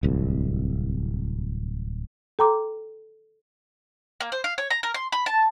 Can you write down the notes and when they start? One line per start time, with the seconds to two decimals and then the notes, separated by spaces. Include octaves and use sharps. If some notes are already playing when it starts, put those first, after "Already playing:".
0.03 D1 C2
2.39 A4 G5 A#5 C6 D6
4.21 A#3
4.32 C5
4.44 F5
4.58 C#5
4.70 A#5
4.83 A#4
4.94 C6
5.12 B5
5.26 A5